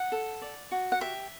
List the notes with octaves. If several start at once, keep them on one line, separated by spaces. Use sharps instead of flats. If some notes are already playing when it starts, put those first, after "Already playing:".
Already playing: F#5
A4
D5
F#4
F#5
G4 E5